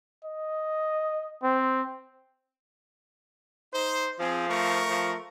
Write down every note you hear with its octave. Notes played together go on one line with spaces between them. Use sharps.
D#5
C4
D#4 C5
F3 C4 G#4
A3 A#4 C#6
F3